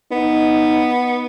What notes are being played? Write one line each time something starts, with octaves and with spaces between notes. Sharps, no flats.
B3 D#4